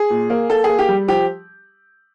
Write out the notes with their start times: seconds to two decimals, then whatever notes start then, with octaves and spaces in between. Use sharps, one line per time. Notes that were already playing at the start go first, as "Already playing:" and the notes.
Already playing: G#4
0.10 A#2
0.30 A#3
0.49 A#3 A4
0.64 G#4
0.69 A#3
0.79 G4
0.88 G3
1.08 F3 G4